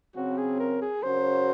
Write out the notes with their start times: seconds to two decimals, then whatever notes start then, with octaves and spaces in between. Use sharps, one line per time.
0.16 C#3 F#3 C4 F#4
0.38 G#4
0.59 A#4
0.82 G#4
1.03 C#3 F#3 C#4 F#4 A#4 C5